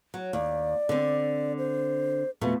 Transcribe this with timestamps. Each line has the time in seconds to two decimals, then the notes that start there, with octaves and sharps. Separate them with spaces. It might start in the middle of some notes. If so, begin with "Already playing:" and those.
0.14 F#3
0.33 D#2 D5
0.89 D3 C4
1.58 C5
2.41 F2 B2 A3